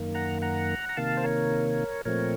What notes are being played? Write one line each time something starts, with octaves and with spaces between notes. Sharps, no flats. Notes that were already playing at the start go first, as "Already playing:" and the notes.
Already playing: F#2 D#3 A#3
F#5 A#5
F#5 A#5
A#5
C3 D#3 A#3 F5 A5
C5
A#4 C#5
A#2 F3 A3 C4 A#4 C#5